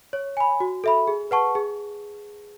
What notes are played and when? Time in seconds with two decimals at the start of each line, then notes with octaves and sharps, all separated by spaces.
0.13 C#5
0.37 G#5 B5
0.60 F#4
0.84 A4 E5 B5
1.08 G#4
1.31 B4 F#5 A5 C#6
1.55 G#4